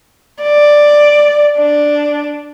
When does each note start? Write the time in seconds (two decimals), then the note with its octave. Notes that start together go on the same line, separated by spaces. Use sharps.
0.42 D5
1.59 D4